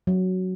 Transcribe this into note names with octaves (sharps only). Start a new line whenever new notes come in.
F#3